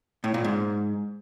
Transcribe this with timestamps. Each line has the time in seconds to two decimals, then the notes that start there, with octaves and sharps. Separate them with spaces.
0.24 A2
0.34 A#2
0.44 G#2